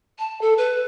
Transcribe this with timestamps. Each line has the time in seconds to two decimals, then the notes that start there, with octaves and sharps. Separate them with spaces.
0.19 A5
0.41 A4
0.58 B4